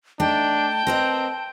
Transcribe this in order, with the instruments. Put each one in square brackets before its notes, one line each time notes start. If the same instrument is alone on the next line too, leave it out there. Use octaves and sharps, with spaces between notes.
[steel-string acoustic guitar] A3 D#4 [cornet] D4 [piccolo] G5 [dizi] A5
[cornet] C4 [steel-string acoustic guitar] A#4 B4 D#5